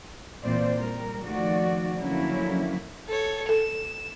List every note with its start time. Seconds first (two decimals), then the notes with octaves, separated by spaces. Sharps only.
0.42 A#2 E3 C4 F4 C5 D5
0.80 G3 A#4
1.24 D#3 F3 A3 F#4 D5
1.98 D3 F3 F#3 A#3 C#4 E4
3.08 A4 C#5
3.49 A4 E7